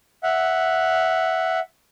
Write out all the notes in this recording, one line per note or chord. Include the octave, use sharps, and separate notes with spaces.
E5 F#5